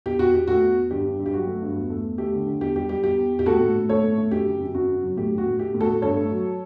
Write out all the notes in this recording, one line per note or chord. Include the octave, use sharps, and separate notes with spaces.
E2 G4
E2 F#4
E2 G4
A3 F#4
E2
E2
G2 G4
G2
G2
G4
F#3 F#4
A3
G2
E2
A3
E2
A3 G4
D3
D3
E2 G4
G3 G4
G3 G4
E2 G4
E2
E2
G4
A2 F#4 A4
A2
A2
A3 A4 C#5
A2
A3
F#2 G4
C#3
F#2
F#2 F#4
C#3
F#3
A2 G4
A2
F#4
A2
A3 G4
A2
F#4 A4
A2
G2 A4 C#5
A3
F#3